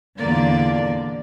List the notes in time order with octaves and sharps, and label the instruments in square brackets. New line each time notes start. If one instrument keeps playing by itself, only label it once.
[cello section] E2 A#2 D3 A#3 D5